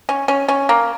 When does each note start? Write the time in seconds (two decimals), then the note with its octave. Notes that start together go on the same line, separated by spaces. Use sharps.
0.09 C#4
0.28 C#4
0.48 C#4
0.69 A#3